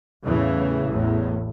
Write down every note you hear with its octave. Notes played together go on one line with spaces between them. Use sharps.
E2 A2 C#3 E3
A1 E2 A2